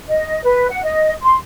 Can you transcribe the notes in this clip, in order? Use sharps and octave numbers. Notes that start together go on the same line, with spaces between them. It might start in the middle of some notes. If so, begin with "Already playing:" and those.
D#5
B4
F#5
D#5
C6